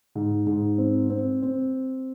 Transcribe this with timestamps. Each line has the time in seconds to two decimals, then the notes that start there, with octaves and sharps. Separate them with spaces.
0.15 G#2
0.47 G#2
0.78 C4
1.10 C4
1.42 C4